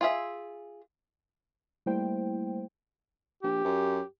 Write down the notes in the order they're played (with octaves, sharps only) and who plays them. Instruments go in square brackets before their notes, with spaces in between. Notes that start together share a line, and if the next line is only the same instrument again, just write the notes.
[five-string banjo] F4 G#4 E5
[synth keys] G3 A3 A#3 E4 C5 G5
[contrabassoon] A#1 [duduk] G4
[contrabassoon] F#2